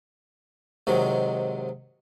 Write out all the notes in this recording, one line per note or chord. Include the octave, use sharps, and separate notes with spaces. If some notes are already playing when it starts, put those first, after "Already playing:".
G#2 C3 D#3 F#3